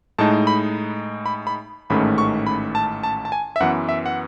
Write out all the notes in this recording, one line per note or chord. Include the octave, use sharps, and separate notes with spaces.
A2 G#3 D#4 A5
B5
B5
B5
A1 G#2 D#3 A3 C#4 B5
C#6
B5
A5
A5
A5
G#5
E5
F#2 E3 B3 F#5
E5
F#5